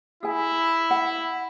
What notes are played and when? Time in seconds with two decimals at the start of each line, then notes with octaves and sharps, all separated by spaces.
0.23 E4 G#4 G#5
0.91 F#5